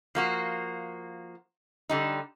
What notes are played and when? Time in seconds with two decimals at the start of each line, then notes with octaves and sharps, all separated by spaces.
0.15 F3 A#3 F#4
1.89 D3 G3 D#4